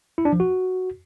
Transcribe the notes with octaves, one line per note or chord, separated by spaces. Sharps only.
E4
D4
F3
F#4